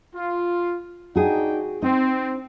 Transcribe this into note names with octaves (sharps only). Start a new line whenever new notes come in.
F4
D4 D#4 F#4 G#4 G5
C4 D#4